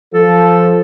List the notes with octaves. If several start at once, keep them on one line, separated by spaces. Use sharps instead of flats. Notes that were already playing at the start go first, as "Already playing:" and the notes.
F3 A4